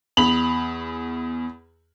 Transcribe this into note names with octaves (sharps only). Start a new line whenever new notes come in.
E2 B5 F7 F#7